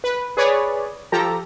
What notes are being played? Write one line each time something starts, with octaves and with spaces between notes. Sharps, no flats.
B4
G#4 B4 C#5 D5
F3 G4 A4 A#5